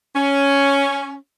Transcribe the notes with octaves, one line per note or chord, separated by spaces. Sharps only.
C#4